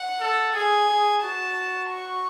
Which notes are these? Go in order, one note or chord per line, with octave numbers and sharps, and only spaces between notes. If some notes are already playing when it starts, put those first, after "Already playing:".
Already playing: F#5
A4
G#4 G#5
G#4
F#4 A5
C#6